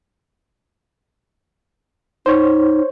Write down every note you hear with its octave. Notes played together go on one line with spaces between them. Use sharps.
D#4 C5 C#5